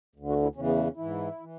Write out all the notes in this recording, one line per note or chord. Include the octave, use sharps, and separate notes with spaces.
D2 D3
F#4
E4
E2 C#3 E3 C#4
B3
A3
C#4
G#2 E3 E4
E3